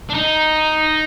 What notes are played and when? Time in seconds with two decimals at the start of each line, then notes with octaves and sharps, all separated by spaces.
0.10 D4
0.14 D#4